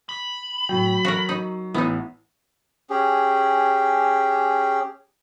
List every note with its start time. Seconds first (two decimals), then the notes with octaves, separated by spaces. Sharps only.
0.09 B5
0.69 A2 F#3 G5
1.05 F#4 A#4 C#6
1.29 D#4
1.74 A1 B3 D#4 E4
2.90 C#4 G4 G#4